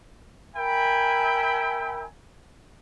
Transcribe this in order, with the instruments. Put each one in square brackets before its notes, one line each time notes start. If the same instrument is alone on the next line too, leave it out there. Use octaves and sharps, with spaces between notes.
[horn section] A#4 E5 G5 G#5 B5